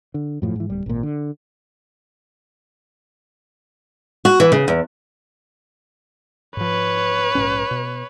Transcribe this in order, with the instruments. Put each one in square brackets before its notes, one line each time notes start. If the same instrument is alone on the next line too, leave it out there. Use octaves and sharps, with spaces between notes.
[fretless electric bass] D3
F#2 A2 F3
G#2 E3
D1 G3
G#1 A#2
D3
[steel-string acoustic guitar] F#4
E3
C#3
E2
[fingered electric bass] G#2 F3 [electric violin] B4 C#5
[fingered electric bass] A#1 G#2 C#4
B2